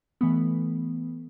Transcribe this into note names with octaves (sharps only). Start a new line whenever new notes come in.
E3 A3 B3